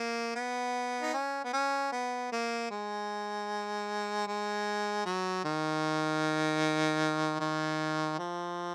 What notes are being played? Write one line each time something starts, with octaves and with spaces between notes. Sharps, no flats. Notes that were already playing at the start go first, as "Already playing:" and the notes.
Already playing: A#3
B3
D#4
C#4
B3
C#4
B3
A#3
G#3
G#3
F#3
D#3
D#3
F3